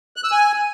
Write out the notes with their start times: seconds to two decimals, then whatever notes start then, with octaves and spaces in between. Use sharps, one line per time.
0.16 F#6
0.24 E6
0.31 G#5